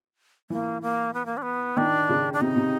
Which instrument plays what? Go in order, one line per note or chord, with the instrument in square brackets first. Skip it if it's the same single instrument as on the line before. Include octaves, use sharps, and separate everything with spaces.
[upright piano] E3 [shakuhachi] A#3
[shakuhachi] A#3
B3
A#3
D4
B3
[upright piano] D#3 [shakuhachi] D4
[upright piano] C#3
[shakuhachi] D4
[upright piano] C3 [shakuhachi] D#4
[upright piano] C3